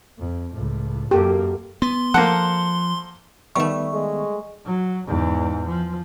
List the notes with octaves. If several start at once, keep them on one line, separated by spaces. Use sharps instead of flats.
F2
C#2 A2
F#2 A#3 G4 A4
B3 C6
F3 A#3 A4 C5 F#5
D#3 G3 A3 B3 E5 C#6
G#3
F#3
E2 G#2
F3